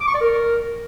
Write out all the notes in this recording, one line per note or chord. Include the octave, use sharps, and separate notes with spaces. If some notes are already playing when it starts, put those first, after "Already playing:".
D6
C#6
D5
A#4